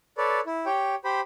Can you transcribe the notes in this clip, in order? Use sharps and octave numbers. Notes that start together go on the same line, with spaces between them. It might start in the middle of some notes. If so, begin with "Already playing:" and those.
A4 B4 C#5 D5
E4
G4 C#5 G5
G4 C5 B5